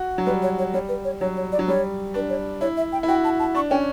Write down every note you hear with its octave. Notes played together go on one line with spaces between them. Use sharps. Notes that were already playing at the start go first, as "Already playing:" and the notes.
Already playing: F#4
F#3
G3 B4
C#5
C#5
G3 C#5
B4
C#5
F#3 C#5
C#5
D5
F#3
G3 C#5
D4 B4
C#5
E4 C#5
E5
G5
E4
F#4 G5
A5
A5
D4 C#6
C#4 G5